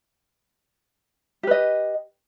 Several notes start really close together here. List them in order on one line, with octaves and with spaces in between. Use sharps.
G4 B4 D#5